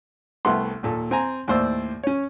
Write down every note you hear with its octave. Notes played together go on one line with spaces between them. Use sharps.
C2 A3 B3 F#5 C6
D#2 A#2 A4
C4 G#5 A#5
D#2 A2 C5 D5 E6
C#4 C#5